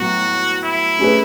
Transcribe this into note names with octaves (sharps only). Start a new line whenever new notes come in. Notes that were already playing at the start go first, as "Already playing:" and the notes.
Already playing: A2 F#3 B3 F#4
E4
A3 C#4 G#4 B4